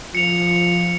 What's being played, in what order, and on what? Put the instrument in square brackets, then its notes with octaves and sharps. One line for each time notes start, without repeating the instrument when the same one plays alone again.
[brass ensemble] F3 F4 [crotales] C#7 F7